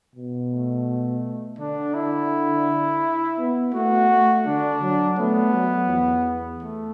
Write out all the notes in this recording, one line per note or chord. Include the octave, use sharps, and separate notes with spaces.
B2
A3
D3 D4
E4
B3
A3 F#4
A3
D3 D4
F#3
A3 B3
F#3
E2
A3